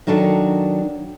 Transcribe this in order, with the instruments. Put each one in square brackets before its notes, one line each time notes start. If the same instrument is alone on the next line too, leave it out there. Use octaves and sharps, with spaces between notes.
[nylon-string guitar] D#3 F#3 D4 A4 A#4